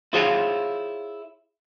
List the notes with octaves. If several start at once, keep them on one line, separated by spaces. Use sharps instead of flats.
E4 F4 G#4 C5 C#5 F5